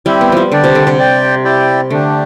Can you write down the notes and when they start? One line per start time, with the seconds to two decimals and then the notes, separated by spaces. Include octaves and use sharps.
0.06 G3 C4 E4 G4
0.21 B3
0.32 F3 G3
0.52 D3 D4 G4 D5
0.64 C3
0.75 D3
0.87 C3
0.98 G4 D5 G5
1.44 E4 G4 D5 G5
1.90 D3 A3 D4 G4